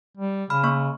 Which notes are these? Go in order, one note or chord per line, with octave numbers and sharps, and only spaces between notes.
G3
C#3 B5 F6
A#3 C#6